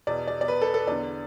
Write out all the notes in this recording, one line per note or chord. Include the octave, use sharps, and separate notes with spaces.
E2 B2 D5
D5
D5
B4
A4
A4
E2 D3 D5